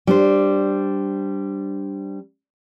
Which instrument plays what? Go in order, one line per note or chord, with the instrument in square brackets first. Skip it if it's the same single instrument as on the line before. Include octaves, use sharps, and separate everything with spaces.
[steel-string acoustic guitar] G3 D4 C5